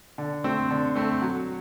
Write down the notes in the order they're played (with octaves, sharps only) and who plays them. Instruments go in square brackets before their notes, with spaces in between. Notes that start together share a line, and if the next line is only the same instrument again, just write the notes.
[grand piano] D3
A3 C4
D3
A3 C4
F#3